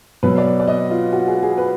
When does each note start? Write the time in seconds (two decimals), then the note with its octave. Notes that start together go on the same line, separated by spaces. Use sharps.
0.23 B2 F#3 B4
0.38 D5
0.59 D5
0.68 D#5
0.90 F4
1.13 F#4
1.27 G#4
1.43 G#4
1.58 B4